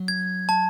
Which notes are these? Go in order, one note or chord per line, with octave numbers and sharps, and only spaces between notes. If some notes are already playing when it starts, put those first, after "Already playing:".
Already playing: F#3
G#6
A5